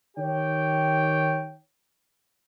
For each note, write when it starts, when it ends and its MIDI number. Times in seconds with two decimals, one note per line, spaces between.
0.18 1.56 51
0.18 1.56 67
0.18 1.56 73
0.18 1.56 79